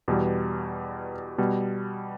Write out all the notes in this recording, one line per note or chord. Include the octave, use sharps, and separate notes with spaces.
E2 B2 G3
B2 G3